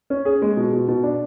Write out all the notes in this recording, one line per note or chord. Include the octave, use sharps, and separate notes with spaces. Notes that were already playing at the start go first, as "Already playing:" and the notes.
C#4
G#4
G#3
B2
B2
B2
D4